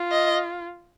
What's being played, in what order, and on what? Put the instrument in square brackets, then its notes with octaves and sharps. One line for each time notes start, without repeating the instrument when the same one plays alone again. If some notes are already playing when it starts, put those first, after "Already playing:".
Already playing: [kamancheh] F4
[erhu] D#5